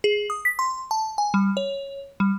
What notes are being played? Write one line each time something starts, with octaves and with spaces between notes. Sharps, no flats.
G#4
D#6
B6
C6
A5
G#5
G3
C#5
G3